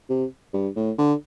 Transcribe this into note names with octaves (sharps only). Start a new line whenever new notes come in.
C3
G2
A2
D3